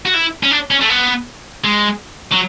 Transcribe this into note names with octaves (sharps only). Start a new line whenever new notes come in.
F#4
E4
C#4
D4
C#4
A3
B3
G#3
F#3